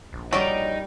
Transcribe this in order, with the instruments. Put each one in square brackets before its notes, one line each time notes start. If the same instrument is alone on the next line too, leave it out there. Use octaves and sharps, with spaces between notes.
[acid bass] A#1
[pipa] F#3 [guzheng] G3 A#4 D5 [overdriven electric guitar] D#4